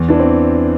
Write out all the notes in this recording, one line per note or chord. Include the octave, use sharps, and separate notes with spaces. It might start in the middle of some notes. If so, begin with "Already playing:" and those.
Already playing: E2
E3 D4
C4